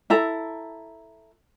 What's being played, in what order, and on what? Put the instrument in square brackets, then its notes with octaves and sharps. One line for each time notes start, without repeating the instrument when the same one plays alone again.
[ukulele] E4 A4 A#5